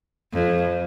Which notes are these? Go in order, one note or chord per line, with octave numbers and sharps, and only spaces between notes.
F2